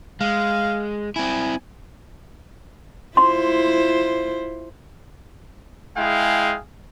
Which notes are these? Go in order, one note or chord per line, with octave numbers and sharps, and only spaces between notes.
G#3 F5
C4 E4 G#5
E4 F4 C5 C6
G#3 E4 G#4 F5 G5